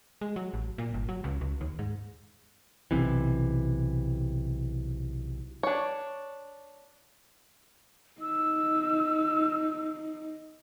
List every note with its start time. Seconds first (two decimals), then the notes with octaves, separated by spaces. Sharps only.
0.21 G#3
0.36 F#3
0.54 A1
0.78 A#2
0.94 G1
1.09 F#3
1.24 C#2
1.41 C#2
1.61 D#2
1.79 G#2
2.91 B1 C3 E3
5.63 D4 C#5
8.22 D#4 E6